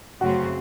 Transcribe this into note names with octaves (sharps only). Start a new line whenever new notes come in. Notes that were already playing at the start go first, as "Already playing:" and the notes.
F#2 C#3 F#3 A3 C4 F#4